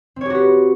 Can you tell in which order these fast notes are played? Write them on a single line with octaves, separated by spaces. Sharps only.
C4 C#5 G4 F#4 B4